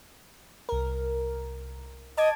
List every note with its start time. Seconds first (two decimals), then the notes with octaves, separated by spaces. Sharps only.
0.69 C2 A#4
2.18 D#5 A5 D6 G#6